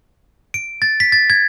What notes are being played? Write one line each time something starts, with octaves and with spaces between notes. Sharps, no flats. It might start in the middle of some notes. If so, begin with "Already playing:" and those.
D7
A6
B6
A6
G#6